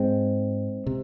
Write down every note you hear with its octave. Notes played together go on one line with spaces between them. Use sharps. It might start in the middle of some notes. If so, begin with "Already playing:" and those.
Already playing: G#2 G#3 C4
C3